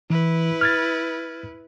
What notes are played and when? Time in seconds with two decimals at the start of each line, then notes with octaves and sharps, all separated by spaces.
0.10 E3 E4 B4
0.61 F6 G#6 A6